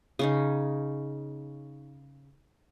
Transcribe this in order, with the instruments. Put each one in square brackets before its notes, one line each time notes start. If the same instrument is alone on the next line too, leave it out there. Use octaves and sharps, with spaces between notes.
[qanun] C#3 C#4 D#4